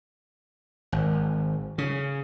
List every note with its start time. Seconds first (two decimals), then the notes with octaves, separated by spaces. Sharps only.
0.92 G#1
1.78 C#3